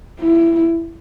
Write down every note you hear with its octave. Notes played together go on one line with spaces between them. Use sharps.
E4